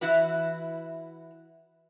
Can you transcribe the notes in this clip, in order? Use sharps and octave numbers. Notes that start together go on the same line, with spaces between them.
E3 E4 F#4 B4